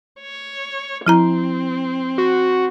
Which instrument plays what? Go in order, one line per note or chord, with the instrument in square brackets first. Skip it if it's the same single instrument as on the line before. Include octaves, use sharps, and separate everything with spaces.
[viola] C#5
[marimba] F3 E4 A#5 [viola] C4
[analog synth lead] F#4